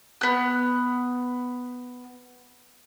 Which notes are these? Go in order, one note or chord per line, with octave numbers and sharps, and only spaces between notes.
B3 F#6